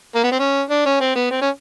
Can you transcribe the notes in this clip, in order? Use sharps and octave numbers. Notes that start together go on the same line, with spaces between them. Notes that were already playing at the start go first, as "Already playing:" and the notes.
A#3
B3
C4
C#4
D4
C#4
C4
B3
C4
C#4